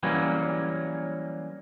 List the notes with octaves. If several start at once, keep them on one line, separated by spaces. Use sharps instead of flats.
E3 F#3 G3 A#3 C#4